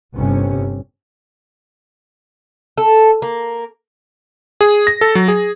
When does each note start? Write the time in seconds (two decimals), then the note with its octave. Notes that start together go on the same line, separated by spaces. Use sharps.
0.13 G1 C3 C#4
2.78 A4
3.22 A#3
4.61 G#4
4.87 A#6
5.01 A4
5.15 F#3
5.28 G#4